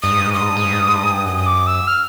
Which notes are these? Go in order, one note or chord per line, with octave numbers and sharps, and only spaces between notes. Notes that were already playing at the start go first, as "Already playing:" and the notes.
G2 D#6
G#2
G2
G#2
G2 D#6
G#2
G2
G#2
G2
G#2
G2
G#2
G2
G#2
G2
F#2 D#6
D#6
D6
E6
F6